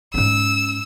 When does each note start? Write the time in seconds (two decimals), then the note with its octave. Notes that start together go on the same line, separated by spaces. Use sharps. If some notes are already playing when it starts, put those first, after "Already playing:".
0.14 G#2 C#4 E6